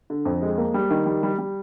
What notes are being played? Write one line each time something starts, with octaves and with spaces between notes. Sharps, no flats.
D3
F2
G#3
A#3
G3
D#3
G3
G3
G3